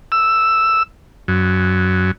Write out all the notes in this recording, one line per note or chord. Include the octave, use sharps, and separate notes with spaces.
E6
F#2